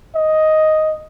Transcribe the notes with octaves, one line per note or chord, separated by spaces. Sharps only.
D#5